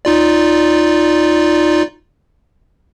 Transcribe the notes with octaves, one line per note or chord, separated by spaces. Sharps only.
D#4 F4 D5